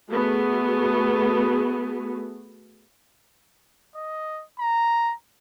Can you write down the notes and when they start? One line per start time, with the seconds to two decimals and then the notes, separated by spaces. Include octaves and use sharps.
0.10 A3 B3 F#4 G#4
3.96 D#5
4.60 A#5